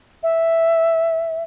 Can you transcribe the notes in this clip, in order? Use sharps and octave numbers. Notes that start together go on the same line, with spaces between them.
E5